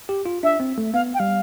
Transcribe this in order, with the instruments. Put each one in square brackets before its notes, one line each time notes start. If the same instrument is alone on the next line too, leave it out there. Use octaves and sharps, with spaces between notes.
[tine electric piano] G4
F4
[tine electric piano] D4 [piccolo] E5
[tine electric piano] C4
A3
[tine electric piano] B3 [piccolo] F5
[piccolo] G5
[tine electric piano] G3 [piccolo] F5